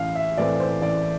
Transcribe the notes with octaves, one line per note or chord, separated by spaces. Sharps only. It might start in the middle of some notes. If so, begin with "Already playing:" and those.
Already playing: A1 F5
E5
A2 E3 A3 C4 D5
C5
A1 D5